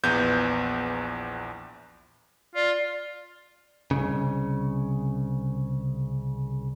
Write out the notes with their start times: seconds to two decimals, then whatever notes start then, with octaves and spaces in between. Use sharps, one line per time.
0.04 A#1 E2 B3 G6
2.55 F4 D5
3.91 C2 G#2 C#3